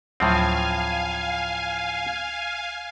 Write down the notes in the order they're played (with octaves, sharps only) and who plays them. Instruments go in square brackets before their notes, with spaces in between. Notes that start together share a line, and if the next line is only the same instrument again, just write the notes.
[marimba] D2 F#3 D#6 [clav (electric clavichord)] A2 F3 C4 [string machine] F5 G#5